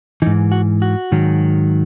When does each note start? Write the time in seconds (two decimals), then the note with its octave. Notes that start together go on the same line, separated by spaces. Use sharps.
0.22 E3 D#4
0.26 G#2
0.52 F#4
0.82 F#4
1.12 G#2 D#3 F#3